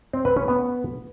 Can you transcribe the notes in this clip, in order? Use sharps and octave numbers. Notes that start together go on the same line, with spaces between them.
C4
B4
C#4
B3